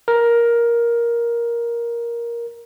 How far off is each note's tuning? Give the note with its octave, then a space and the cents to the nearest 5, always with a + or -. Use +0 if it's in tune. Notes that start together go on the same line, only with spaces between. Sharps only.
A#4 +10